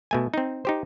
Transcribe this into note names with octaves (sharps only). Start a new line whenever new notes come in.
B2 A3 G#5
C4 D#4
D#4 G4 C5